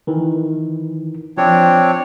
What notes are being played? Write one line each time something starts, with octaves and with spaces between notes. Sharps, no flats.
D#3 E3
F3 C4 D4 C#5